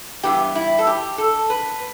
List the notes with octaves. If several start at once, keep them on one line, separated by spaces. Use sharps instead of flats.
G2 E3 B3 G4
E4
A4
G4
A4
B4